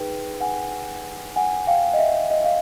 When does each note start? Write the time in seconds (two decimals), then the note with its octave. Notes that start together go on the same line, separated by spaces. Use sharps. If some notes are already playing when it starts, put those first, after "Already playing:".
Already playing: D#4 G#4 B4 G5
0.41 F#5 G#5
1.36 F#5 G#5
1.67 F5 G5
1.93 D#5
1.99 E5
2.30 D#5
2.44 F5